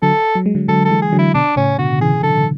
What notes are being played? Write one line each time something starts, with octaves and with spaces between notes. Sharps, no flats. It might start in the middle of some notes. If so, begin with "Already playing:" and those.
D3 F#3 A4
F#3
G#3
D3 F#3
D3 F#3 A4
A4
E3 G#3
G#4
D3 F#3
E4
B2 D3 D4
A2 C#3 C#4
B2 D3 F#4
C#3 E3 G#4
D3 F#3 A4